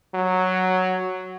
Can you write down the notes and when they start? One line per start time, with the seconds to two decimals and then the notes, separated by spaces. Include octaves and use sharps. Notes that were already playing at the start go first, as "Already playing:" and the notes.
0.14 F#3